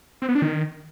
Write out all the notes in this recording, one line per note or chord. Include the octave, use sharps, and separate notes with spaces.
C4
B3
D4
D#3